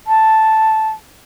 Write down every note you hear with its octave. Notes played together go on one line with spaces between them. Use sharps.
A5